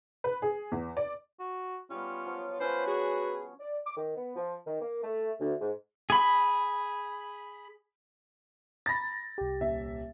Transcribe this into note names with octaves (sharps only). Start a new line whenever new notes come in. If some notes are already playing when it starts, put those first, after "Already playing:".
B4
G#4
E2
D5
F#4
G3 B3 C#4 F4
F3 F#3 C#5
C#4 F4 B4 C5
F#4 G#4
D5
D6
D#3
B3
F3
D#3
A#3
A3
D2
G#2
G#4 B5
A#5 B5 A6 A#6
C2 G4
D#1 E5